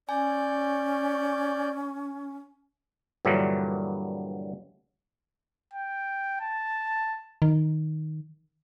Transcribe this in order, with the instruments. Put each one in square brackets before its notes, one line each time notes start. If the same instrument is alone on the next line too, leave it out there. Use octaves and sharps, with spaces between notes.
[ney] C#4 [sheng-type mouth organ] D5 G6 [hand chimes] G#5
[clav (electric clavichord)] G2 A#2 D3 E3 F#3 G3
[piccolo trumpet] G5
A5
[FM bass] D#3